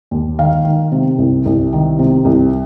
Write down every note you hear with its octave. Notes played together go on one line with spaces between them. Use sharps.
D#2
D#3 F5
D#3
C3
C2
C2
D#3
C3
C2